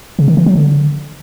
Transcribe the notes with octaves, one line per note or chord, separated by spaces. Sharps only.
C#3
D#3
E3
F#3
D3